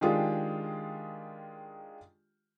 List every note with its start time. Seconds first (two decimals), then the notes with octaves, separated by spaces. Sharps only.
0.01 D#3 G#3 D4 F4 G4 G#4